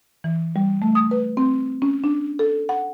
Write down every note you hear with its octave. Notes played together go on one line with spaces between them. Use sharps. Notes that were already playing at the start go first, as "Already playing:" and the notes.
E3
G3
A3
D#6
B4
C4
C#4
D4
A4
F#5